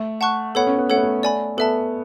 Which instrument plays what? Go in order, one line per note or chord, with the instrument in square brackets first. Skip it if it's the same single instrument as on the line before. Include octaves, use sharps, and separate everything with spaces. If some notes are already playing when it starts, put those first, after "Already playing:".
Already playing: [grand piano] A3
[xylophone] F#5 A5 C#6 F#6
[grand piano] B3 [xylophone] A4 C#5 F#5 B5
[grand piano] C#4
B3
[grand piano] A3 [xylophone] A4 C#5 F#5
[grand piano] B3
A3
[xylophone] D5 G#5 B5
[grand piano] B3 [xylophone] A4 E5 A5